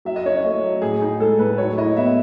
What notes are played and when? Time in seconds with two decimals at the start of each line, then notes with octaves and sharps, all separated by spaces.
0.05 F#3 E5
0.16 D#5
0.25 C#4 C#5
0.37 D#5
0.44 A3
0.63 F#3
0.82 A2 G#4
1.02 D#4
1.20 G#3 A4
1.39 A2 B4
1.58 F#3 C#5
1.77 E4 D#5
1.96 B3 E5